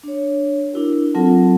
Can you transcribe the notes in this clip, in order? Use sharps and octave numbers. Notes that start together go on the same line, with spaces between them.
D4 C#5
D4 E4 F#4 A#4
F#3 C4 F4 A4 F#5 A5